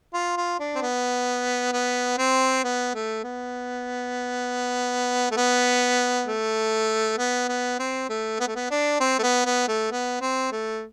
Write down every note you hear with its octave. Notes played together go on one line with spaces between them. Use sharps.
F4
F4
D4
C4
B3
B3
C4
B3
A3
B3
A3
B3
A3
B3
B3
C4
A3
B3
A3
B3
D4
C4
A3
B3
B3
A3
B3
C4
A3